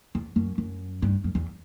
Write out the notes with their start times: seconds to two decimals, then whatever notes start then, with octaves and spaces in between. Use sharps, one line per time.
0.15 E2
0.36 F#2
0.58 F#2
1.02 G2
1.24 F#2
1.35 E2